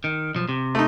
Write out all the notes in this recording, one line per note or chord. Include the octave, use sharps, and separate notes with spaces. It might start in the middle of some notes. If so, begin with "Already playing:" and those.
D#3
B1 F3
C3
A3 D#4